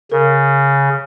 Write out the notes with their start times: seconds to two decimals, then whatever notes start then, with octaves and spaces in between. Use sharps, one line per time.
0.12 C#3 A#4